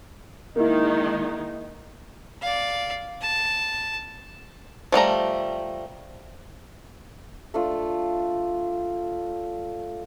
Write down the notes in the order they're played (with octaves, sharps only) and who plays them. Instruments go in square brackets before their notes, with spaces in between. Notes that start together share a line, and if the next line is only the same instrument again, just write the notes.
[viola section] D#3 G#3 D#4 [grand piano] A#3 E4
[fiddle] D5 F5
A5
[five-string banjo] F3 G3 A3 A#5
[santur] A3 D4 F4